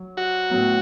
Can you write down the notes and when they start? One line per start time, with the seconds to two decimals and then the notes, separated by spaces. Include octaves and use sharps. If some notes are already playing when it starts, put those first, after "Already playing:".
Already playing: F#3
0.17 F#4
0.50 A2 F#3 B3